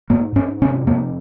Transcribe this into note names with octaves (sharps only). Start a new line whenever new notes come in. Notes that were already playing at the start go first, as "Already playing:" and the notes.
G#2 A#3
G#2 C#4
C3 C#4
F2 A#3